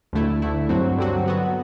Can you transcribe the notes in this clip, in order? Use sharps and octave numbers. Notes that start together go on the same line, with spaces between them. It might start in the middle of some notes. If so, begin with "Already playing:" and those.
D2 D3 A3 E4
D2 D3 A3 E4
G2 D3 F#3 C4 F#4
G2 D3 F#3 C4 F#4
F#3 B3 F#4